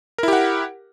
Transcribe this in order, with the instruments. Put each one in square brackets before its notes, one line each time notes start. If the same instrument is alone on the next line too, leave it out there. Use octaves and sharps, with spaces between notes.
[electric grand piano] A#4
E4
G4
F#5